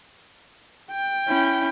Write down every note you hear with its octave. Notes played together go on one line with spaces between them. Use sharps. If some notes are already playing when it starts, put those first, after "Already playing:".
G5
C#4 E4